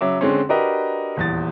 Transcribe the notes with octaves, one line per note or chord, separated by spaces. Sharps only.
C#3 F#3 E5 D6
D3 G#3 C4 C#4
D4 F#4 G4 A#4 B4 D#5
D#1 E2 A6